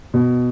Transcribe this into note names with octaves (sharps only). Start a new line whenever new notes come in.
B2